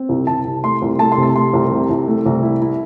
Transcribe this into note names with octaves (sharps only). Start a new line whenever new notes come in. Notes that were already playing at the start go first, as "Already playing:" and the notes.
Already playing: C4
C2
C2 A5
C3
A3 C6
C2
A3 A5
C6
C3
A5
A3 C6
C2
C3
C2
A3
C2
E4
E4